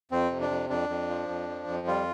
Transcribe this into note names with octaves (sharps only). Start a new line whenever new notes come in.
F2 C4
C3
D4
F2
F2 D4
F2
F3
F2
F3
F2
G3 F4